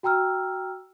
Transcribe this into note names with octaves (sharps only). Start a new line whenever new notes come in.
F#4 G5 A#5 E6 F6